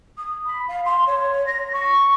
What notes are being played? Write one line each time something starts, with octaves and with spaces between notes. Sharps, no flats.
D#6
B5
F5
C6
C#5
A#6
C#6